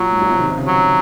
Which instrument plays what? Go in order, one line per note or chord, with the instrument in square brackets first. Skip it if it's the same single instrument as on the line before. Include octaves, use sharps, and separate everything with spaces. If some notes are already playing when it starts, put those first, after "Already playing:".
Already playing: [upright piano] A#2 [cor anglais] F#3
[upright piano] G#2
A#2
C3 F3
D#3
C3
C#3
[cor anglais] F#3